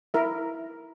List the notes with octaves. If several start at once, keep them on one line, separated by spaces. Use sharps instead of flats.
E4 A#4 E5